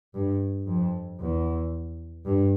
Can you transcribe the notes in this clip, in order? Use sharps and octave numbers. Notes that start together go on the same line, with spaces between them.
G2
F2
E2
G2